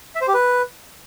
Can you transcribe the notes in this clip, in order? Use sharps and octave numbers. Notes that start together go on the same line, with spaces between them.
E5
C5
G4
B4